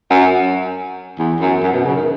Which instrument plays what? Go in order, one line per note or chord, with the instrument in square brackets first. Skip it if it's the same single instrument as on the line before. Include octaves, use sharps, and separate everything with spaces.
[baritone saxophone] F#2
E2
F#2
F#2
B2
C#3
D#3